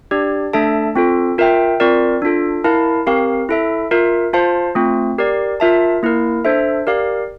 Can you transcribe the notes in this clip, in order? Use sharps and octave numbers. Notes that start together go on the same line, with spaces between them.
D4 G4 D5
A3 D4 A4 E5 A5
C4 F4 A4
F4 A#4 E5 G5
C4 F4 A#4 D5
D4 F4 A4
E4 A#4 F5 A5
C4 G4 A#4 F5
E4 A4 E5
F4 A#4 E5
F4 C5 F5 A5
A3 C4 F4
G4 A#4 D5
F4 A#4 E5 A5
A#3 E4 A#4
D4 A4 C5 E5
G4 A#4 D5 F5